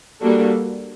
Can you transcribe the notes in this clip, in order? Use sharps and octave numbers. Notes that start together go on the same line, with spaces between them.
G3 A#3 D4 F#4 A4